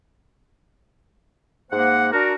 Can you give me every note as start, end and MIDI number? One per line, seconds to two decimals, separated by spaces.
1.71 2.07 44
1.71 2.07 58
1.71 2.07 72
1.71 2.07 78
2.12 2.33 62
2.12 2.33 66
2.12 2.33 70